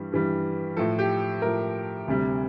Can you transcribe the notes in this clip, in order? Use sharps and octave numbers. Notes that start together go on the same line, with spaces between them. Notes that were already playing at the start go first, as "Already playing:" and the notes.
Already playing: G2 E3 G3
G2 E3 G3
A2 F3 A4
G4
A2 F3 A#4
D2 C3 G3